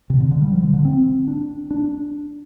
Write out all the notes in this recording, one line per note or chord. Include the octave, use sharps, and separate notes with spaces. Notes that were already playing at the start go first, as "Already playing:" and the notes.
C3
D3
D3
G3
F3
D3
D3
C4
D4
D4